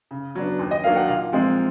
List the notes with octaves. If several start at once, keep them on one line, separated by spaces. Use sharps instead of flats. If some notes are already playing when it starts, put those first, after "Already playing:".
C#3
F#3 B3 D4
D#2
D#5
D#3 F#3 A#3 D4 F5
F#5
A#2 F5
F3 G#3 C4 D#4